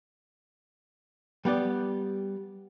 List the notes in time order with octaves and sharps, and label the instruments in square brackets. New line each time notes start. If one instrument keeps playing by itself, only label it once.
[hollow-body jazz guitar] G3 B3 G4 D5